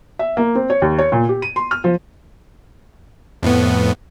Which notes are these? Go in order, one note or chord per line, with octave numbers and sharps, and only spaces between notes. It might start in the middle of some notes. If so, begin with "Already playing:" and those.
E5
A#3
C4
C#5
D#2
C#5
A#2
G4
D#7
C6
F6
F3
F2 A2 B3